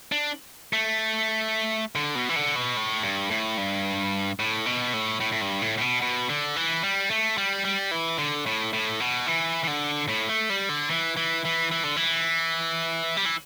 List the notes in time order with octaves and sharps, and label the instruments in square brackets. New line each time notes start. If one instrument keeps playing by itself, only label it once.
[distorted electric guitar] D4
A3
D3
B2
E3
D3
B2
A2
G2
A2
G2
A2
B2
A2
A2
A2
G2
A2
A2
B2
B2
D3
E3
G3
A3
G3
G3
E3
D3
A2
A2
B2
E3
E3
D3
A2
A3
G3
D3
E3
E3
E3
E3
D3
E3
G3
E3